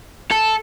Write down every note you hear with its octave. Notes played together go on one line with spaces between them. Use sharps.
A4